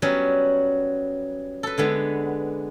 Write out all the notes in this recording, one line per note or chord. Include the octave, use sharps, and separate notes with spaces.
F#3 G3 B3 C#4
A4 B4
D3 G#3 B3